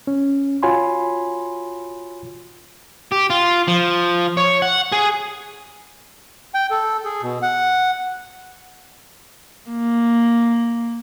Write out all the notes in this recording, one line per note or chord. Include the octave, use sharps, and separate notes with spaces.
C#4
F4 F#4 C#5 G#5 B5 C6
G4
F4
F3
C#5
F#5
G#4
G5
A4
G#4
B2
F#5
A#3